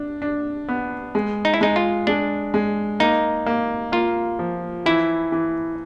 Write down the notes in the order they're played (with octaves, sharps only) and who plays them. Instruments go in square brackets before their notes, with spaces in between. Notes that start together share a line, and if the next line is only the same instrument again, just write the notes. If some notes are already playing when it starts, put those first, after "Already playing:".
Already playing: [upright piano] D4
D4
B3
G#3
[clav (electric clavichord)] D#4
E4
[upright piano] G#3 [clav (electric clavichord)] D#4
[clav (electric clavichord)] F4
[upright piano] G#3 [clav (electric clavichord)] D4
[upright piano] G#3
[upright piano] A#3 [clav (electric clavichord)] D#4
[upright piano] A#3
[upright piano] A#3 [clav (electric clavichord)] F4
[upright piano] F3
[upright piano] E3 [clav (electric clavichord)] E4
[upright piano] E3